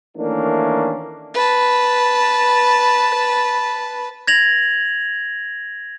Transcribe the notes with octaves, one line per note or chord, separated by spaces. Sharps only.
D#3 E3 A3 A#3 C#4 D4
B4 A5
G#6 A#6 F7 F#7